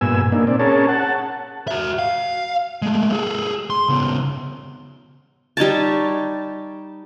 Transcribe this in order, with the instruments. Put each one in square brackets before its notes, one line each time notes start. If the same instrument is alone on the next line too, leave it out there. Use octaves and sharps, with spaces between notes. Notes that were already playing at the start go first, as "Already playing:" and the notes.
[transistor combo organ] G2 A#2 B3 G#5 E6
A#2 A#3 D4 D#4
C4 D5
C#4 G#4 A#4 C#5 A5
F#5 A5
[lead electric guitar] F#4 E5
F5
G#3 A3
G#4 A4
C6
C#3 B3
[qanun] G3 D#4 C#5 A5